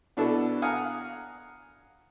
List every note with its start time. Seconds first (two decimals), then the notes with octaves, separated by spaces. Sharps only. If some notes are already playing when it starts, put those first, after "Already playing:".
0.17 B2 B3 D4 E4 F#4 A4
0.62 F5 F#5 G#5 A#5 D#6 F6